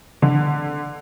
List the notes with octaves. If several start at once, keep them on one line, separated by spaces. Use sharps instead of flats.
D3